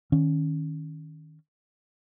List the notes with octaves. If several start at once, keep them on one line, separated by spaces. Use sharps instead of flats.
D#3 C#4